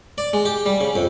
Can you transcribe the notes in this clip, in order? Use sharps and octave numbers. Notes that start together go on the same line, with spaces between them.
D5
G#3
G4
G3
C#3
F2